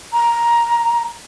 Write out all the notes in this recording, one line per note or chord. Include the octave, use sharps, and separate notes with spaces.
A#5